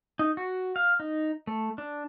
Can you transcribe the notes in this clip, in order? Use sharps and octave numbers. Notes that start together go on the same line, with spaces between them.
D#4
F#4
F5
D#4
A3
D4